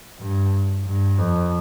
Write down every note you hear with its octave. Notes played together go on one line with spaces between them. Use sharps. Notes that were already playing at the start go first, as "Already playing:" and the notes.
G2
G2
F2